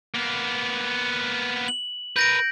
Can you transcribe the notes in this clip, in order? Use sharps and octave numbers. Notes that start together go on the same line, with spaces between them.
A#3 B3
F#7
A#4 B4 G6 A#6 D7